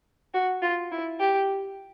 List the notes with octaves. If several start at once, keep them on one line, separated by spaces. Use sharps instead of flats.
F#4
F4
E4
G4